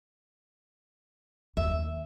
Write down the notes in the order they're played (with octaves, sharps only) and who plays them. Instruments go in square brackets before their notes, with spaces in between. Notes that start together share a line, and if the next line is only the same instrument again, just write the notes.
[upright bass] D#2 [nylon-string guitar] E5